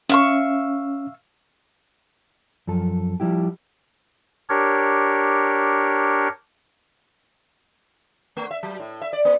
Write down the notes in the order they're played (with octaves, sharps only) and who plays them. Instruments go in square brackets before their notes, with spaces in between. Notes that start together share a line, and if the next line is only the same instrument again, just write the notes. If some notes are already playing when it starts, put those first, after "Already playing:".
[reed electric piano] C#4 [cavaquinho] E5 F5 C#6
[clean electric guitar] F#2 F3 A4
F3 G3 E4 G4
[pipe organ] D4 G4 A#4 C#5
[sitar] A3
E5
F#3
A2
E5
D5
A#3